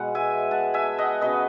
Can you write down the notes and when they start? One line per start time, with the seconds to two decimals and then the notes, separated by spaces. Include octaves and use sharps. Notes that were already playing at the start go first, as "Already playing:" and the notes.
Already playing: B2 G#3 B3 F#5
0.15 E5 G#5
0.51 F#5 A5
0.74 E5 G#5
0.98 D#5 F#5
1.21 C#3 F#3 B3 B4 D#5